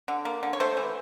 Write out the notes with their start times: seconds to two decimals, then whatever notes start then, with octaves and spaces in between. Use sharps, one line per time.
0.08 D3
0.25 A#3
0.43 D3
0.53 C#5
0.60 A3 C5
0.77 E3